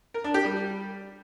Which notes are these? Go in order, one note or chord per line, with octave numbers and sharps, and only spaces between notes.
A#4
D4
G4
G3